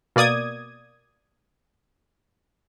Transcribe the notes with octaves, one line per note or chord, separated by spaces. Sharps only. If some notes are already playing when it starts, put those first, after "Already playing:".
B2 A#3 D5 D#6 G#6